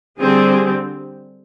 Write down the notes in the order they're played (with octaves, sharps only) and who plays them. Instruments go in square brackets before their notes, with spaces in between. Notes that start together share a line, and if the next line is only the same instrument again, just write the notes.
[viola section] D3 G3 C4 G#4